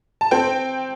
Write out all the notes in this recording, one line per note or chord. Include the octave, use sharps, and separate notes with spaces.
A5
C4 G5